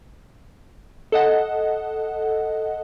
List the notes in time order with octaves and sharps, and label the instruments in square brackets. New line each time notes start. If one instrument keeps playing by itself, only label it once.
[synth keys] A4 D#5 F#5